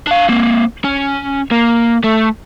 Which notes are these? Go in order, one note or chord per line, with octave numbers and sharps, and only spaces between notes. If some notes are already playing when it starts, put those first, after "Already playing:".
D4 F5
A#3 C4
C#4
A#3
A3